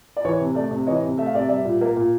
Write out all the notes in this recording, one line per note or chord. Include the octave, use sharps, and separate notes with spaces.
D5
E3 C#5
C3
A3 D5
C3
E3 C#5 D#5
C3
A3 E5
F5
C3 D5 E5
G3 D5 E5
A#2
A#3
A#2